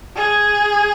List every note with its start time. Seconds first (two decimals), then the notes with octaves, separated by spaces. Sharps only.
0.16 G#4